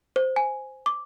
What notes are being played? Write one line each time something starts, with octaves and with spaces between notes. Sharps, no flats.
C5
G#5
D6